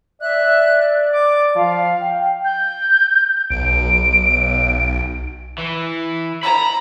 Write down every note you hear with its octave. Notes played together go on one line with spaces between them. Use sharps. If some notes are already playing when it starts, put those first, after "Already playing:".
D5 E5 F#6
D6
F3 F5
G5
G6
B1 D7
E3
A#5 B5